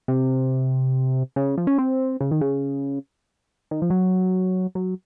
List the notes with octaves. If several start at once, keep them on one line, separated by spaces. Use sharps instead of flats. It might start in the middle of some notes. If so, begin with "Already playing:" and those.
C3
C#3
F3
C#4
C4
C#3
D#3
C#3
D#3
F3
F#3
F#3